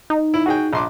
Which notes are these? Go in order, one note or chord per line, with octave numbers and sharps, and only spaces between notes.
D#4
E4
F#4 G#4 G5
A#1 C6 D6